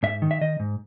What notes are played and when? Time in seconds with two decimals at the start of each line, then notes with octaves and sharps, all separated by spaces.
0.03 G#2 E5
0.22 D#3
0.31 E5
0.41 D#3 D#5
0.60 G#2